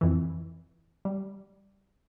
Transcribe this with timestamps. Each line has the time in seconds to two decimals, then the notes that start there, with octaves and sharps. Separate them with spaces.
0.01 F2 E3
1.05 G3